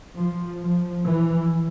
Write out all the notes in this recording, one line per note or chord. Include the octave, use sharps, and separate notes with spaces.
F3
F3
E3